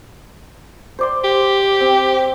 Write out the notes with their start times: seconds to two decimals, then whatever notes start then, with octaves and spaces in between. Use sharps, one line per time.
0.99 C5 D5 C6
1.24 G4
1.80 C4